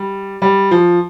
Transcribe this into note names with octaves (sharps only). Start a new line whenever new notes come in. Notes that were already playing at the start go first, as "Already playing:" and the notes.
Already playing: G3
G3
F3